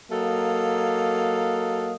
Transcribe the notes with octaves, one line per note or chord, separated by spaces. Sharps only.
F#3 A#3 A4 D#5 F5